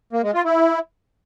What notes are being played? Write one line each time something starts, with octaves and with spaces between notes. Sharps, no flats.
A#3
G#3
F4
E4